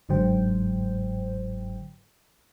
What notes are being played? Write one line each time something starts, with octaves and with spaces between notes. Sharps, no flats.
G1 G#2 D3 F#3 C5 G5